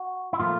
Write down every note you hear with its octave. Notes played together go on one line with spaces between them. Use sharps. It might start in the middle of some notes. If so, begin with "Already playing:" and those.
Already playing: F#4
E4
A#2 F3 A3 F4